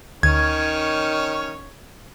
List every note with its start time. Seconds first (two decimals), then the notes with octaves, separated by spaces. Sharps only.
0.23 D2 D#3 C#4 C#5 G#6